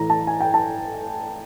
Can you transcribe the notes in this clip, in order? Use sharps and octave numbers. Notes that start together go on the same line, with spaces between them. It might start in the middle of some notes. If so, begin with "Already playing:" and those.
Already playing: A2 E3 A#5
A5
G#5
G5
A5